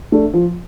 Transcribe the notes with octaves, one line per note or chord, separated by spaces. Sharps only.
A3 D4
F3